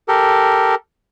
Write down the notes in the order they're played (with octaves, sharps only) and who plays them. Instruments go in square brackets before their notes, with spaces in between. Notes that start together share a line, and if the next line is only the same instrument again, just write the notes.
[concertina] G4 A4 A#4